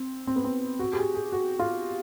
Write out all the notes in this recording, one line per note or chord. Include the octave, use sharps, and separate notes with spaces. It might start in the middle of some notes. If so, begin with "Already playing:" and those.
Already playing: C4
C4
B3
C4
F#4
G4
G#4
G#4
F#4
F4